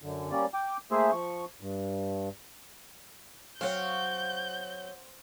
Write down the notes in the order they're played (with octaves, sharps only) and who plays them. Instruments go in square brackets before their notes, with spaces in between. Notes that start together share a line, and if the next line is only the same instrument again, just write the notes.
[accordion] F#2 D3
G3 A#3 C#4 D5
G5 D6
A3 A#3 G#4 C5 E5
F3 C#6
G2
[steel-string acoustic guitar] F#3 C#5 [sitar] C4 [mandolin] F5 F#5 [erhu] G6